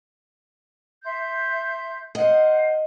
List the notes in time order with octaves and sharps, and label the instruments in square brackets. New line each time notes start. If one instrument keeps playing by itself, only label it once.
[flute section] E5 C6 G6
[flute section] C5 F5 F#5 [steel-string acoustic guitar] D#5